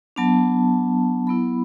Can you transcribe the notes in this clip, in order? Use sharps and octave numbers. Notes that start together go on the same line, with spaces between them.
F#3 B3 D4 A5
F#3 B3 E4 B5